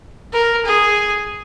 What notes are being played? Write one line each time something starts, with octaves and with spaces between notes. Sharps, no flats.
A#4
G#4